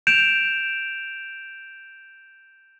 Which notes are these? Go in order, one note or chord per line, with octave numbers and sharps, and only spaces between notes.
G6 D7 E7 F7